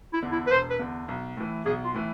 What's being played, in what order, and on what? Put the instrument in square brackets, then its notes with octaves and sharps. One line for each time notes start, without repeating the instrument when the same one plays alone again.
[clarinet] E4
[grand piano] E2 D3
[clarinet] E4
B4
[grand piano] E1 [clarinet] C5
[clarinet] B4
[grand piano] E2 D3
B1
A2 E3
[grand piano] B1 [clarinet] G#4
[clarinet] F4
[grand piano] A2 E3